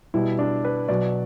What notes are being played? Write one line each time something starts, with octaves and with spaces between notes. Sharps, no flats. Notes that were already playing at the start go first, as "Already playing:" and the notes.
B2 G3 E4
D4
B4
B2 F#3 D5